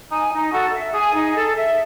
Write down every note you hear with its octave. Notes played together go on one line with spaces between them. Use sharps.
D#4 G#5
D#4
F#4 A4
E5
G#4 G#5
D#4
A4
E5